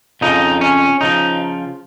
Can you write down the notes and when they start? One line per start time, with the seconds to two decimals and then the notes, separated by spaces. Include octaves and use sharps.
0.21 F2 C#3 F3 D#4
0.61 C#4
1.01 C#3 F3 D#4